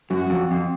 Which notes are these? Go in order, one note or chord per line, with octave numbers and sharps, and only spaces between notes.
F#2 F#4
F2
F2